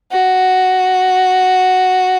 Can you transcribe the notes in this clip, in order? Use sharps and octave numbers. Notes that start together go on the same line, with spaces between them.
F#4